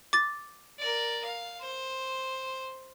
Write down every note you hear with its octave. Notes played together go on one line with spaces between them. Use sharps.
D6 A6
A#4 D5
F5
C5